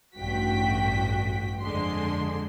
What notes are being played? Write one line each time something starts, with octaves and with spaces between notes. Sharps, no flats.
A1 G2 F#4 G5 B6
F2 D3 G#3 D4 C6